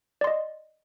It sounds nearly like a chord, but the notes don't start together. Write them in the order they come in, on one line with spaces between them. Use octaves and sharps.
D5 C6 D#5